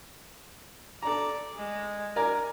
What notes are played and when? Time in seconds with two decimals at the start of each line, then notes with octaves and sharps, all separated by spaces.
1.03 A4 D5 A#5
1.55 G#3
2.16 A#4 D5 G#5 A#5